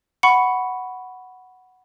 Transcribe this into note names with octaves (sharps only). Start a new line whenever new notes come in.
F#5 B5 C#6 C#7